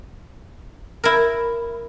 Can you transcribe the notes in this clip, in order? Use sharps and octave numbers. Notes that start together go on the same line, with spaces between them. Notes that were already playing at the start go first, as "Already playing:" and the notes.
E4 A#4